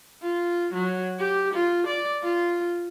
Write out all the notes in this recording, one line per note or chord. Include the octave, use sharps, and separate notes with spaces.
F4
F#3
G4
F4
D5
F4